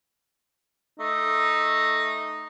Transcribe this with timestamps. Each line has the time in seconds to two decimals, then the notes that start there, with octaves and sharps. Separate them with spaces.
1.00 A3 D#4